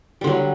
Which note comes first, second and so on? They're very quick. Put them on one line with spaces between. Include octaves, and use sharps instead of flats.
G3 D3 F#3